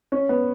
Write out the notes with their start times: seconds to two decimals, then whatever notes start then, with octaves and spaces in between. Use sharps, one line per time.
0.12 C#4
0.29 B3